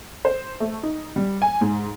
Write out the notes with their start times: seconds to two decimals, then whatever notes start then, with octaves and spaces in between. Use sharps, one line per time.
0.25 C5
0.60 A3
0.83 D#4
1.16 G3
1.42 G#5
1.61 G#2